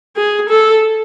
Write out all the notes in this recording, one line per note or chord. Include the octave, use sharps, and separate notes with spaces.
G#4
A4